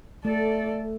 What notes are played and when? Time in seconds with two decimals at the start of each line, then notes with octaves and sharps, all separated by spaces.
0.25 A3 A4 D5